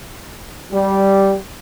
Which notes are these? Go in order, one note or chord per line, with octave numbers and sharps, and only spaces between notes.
G3